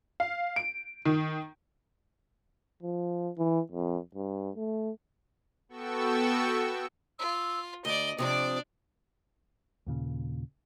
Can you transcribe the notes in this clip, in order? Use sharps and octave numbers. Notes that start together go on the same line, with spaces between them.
F5
D7
D#3
F3
E3
F2
G2
A3
B3 F#4 A4 G5 C#6 E6
F4 E6
D2 D5 D#5 G7
C3 F3 C4 D4 D5 D#6
D#2 A#2 C#3